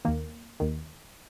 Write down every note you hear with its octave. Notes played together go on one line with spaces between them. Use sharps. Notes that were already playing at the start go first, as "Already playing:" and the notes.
D#2 D#3 A#3
D#2 D#3